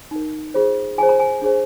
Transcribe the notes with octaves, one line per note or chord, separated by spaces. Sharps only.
D#4 A#4
F4 G#4 C5
F4 G#4 C5 G#5
A#5
G#5
D4 G#4 C5